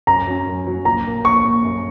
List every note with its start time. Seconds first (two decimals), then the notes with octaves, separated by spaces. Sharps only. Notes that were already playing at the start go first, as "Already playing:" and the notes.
0.07 F#2 A#5
0.27 F#3 C#4
0.46 F#2
0.66 F#3 C#4
0.85 A#1 A#5
1.04 A#2 A#3
1.24 A#1 C#6
1.45 A#2 A#3
1.64 F#2